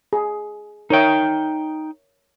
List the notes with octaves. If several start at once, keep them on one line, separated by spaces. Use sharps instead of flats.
G#4
D#4 A#4 C#5 E5 G5